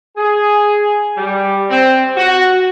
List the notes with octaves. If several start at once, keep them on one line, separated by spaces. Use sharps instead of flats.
G#4
G3
C4
F#4